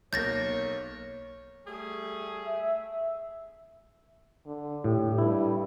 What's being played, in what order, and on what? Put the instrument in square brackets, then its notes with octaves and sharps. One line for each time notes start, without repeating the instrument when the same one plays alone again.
[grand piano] B1 A#3 [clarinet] C#5 [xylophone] G6 A6 A#6
[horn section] G3 A3 G#4
[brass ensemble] E5
[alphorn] D3
[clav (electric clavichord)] A2 [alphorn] G4
[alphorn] G2 [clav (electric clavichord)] E4